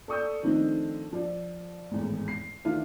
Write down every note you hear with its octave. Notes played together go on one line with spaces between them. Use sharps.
A4 D5 C#6 D#6 E6 G6
D#3 F3 A3 C4 D4 D#4
F3 D5
G#1 E2 A2
C7
D#3 E3 A3 D4 E4 F4